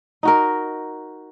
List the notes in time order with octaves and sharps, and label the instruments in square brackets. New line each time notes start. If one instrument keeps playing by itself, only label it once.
[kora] D#4 F#4 A#4